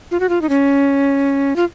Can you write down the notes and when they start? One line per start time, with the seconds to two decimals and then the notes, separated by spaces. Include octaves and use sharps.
0.11 F4
0.20 F#4
0.29 F4
0.42 D#4
0.49 C#4
1.56 F4